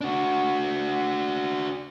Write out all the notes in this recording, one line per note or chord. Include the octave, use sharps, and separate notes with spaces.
D4 F#4